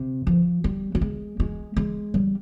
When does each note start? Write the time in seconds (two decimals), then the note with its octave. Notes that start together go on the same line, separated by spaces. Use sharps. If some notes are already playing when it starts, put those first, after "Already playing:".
Already playing: C3
0.27 F3
0.64 G3
0.95 G3
1.01 G#3
1.40 G#3
1.77 G#3
2.14 G3